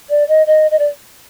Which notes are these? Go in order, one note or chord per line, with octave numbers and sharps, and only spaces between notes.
D5
D#5
D#5
D#5
D5